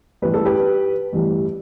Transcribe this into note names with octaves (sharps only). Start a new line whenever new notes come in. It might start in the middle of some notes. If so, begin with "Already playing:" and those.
A1 G2 E3 G3 B4
A4
G4 B4
A1 G2 E3 G3